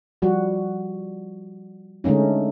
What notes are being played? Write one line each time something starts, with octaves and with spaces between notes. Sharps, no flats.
F3 G3 F#4
D3 G#3 A3 C#4 D#4